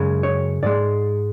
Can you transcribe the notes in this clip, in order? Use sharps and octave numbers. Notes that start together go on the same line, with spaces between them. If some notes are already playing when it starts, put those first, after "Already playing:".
Already playing: F#2 C#3 G#3
C#5
G#2 G#3 D5